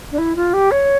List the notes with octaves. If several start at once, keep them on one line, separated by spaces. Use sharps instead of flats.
D4
E4
F4
G4
C#5